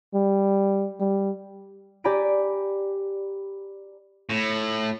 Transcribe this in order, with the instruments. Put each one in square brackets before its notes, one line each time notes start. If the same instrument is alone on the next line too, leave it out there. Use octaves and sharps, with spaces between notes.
[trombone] G3
G3
[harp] G4 D5 G#5 A#5 B5 D7
[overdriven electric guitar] A2